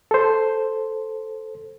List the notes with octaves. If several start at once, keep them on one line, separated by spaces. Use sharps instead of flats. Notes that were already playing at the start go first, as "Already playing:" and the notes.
A4 C5